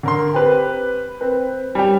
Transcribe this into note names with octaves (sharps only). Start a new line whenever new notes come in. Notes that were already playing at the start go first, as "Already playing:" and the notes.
D3 A#4 C6
C4 G4 B4
C4 B4
G3 C#4 G4